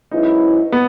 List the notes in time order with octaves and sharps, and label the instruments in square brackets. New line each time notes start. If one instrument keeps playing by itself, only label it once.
[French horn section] G#2 F#3 C#4 E4 B4 [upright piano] D#4
[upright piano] B3